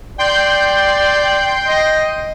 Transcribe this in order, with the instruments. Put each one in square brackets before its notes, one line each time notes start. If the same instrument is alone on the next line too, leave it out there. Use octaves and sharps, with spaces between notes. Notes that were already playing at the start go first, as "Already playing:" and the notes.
[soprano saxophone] D5 [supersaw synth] G5 C6 G6
[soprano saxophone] D#5